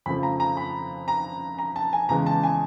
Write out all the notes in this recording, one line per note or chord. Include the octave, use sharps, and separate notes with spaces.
F2 C#3 F3 A3 B5
A#5
A#5
B5
A#5
A#5
A5
G#5
E2 C#3 E3 G#3 A#5
A5
G#5